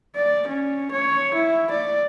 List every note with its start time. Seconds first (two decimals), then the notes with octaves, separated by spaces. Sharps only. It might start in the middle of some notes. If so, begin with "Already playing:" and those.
0.15 D5
0.48 C#4
0.92 C#5
1.34 E4
1.71 D5